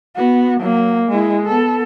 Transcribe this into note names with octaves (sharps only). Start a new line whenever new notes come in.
B3 F#4
F#3 A#3
G#3 E4
B3 A4